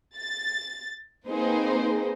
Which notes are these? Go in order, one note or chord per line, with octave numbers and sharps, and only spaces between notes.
A6
A#3 C4 D#4 G#4 B4 C5